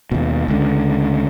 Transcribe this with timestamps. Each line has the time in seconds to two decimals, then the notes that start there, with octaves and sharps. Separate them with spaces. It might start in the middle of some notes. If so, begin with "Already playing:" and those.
0.12 D#2 B2
0.48 C#2 D3